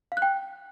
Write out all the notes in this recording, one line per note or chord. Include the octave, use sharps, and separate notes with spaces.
F5
F#6
G5